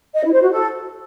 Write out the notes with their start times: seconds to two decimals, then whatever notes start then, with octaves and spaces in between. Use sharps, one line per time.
0.14 D#5
0.23 E4
0.32 C5
0.41 F#4
0.51 A4